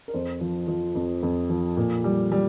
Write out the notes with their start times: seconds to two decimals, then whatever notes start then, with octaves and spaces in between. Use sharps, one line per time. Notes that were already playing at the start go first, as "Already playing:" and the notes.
0.08 A#4
0.14 F2 C5
0.41 F3
0.68 F3
0.95 F2
1.23 F2
1.50 F3
1.77 A#2
2.04 G3
2.32 G3